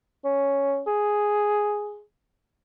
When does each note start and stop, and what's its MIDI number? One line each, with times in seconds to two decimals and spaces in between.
0.24 0.82 61
0.87 2.02 68